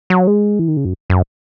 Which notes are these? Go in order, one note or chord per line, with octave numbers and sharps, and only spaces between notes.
F#3
G#3
E3
D#3
C#3
F#2
F#2